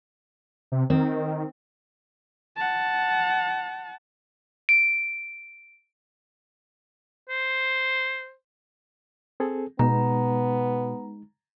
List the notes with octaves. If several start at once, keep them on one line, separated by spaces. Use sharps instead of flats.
C3
D#3 C4
F#5 A5
D7
C5
C4 G#4 A4
B2 G#3 B3 D#4 A#5